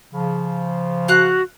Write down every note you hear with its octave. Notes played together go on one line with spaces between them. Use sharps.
C#3 F3
F#4 F5 F#5 F#6